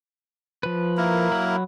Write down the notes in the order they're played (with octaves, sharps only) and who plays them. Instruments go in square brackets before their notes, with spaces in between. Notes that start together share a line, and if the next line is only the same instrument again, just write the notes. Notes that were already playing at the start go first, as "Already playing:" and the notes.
[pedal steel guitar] F3 B4
[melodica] A#3 E4 A#4
[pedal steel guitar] F#3 B5